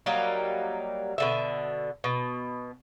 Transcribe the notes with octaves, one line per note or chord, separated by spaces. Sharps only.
F#3 G3 A#3 D#4
B2 D3 E5
B2